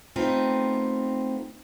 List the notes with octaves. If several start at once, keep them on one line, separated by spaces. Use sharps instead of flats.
A3 B3 C4 D#4 F4